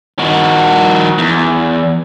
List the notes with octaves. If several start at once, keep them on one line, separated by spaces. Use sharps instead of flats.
D#3 F#4
E2